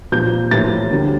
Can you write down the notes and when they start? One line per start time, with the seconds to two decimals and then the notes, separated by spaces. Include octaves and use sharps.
0.12 A#2 F3 A#3 G6
0.51 A2 F3 A#3 A6
0.91 D2 D3 G3 A#3